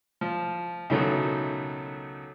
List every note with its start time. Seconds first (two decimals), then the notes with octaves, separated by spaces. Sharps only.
0.21 F3
0.90 C#2 B2 D#3 F#3 A3